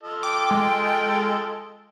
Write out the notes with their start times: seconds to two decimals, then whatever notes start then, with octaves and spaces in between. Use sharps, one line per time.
0.03 F4 A4 D#5
0.23 G5 D6
0.51 G#3